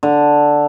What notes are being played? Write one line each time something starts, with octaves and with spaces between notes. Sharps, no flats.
D3